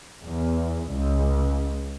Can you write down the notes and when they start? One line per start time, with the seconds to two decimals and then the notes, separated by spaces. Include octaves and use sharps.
0.23 E2
0.89 C#2